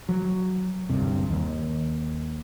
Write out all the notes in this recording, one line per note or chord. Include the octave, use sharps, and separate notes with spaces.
F#3
D2 G2 C3
D#2